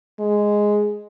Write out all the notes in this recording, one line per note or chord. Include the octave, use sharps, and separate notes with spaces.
G#3